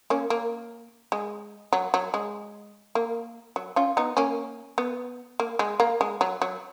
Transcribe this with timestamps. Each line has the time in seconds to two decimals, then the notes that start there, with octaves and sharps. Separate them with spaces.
0.10 A#3 C#4
0.30 A#3
1.12 G#3
1.73 F#3
1.94 F#3
2.14 G#3
2.95 A#3
3.56 F#3
3.76 C#4 F4
3.97 B3 D#4
4.17 A#3 C#4
4.78 B3
5.40 A#3
5.59 G#3
5.80 A#3
6.01 G#3
6.21 F#3
6.42 F#3